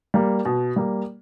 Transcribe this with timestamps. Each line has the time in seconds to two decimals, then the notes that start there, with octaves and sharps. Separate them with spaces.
0.14 G3 A#3
0.45 B2
0.76 G3 A#3